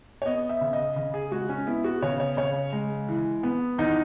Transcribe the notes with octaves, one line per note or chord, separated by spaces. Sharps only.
C#5
B3 D#5
E5
C#3
D#5
C#3 D#5
G#4
G#3 F#4
C#4
B3 E4
F#4
C#3 C#5
C#5
C#3 C#5
G#3
E3
B3
E2 D#4